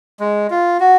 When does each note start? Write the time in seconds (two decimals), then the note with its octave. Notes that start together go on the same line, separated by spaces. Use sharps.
0.20 G#3
0.51 F4
0.80 F#4